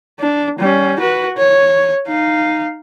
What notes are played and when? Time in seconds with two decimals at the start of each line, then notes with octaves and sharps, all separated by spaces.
0.20 D4
0.59 G3 C#4
1.00 F#4 B4
1.37 C#5
2.08 D#4 F5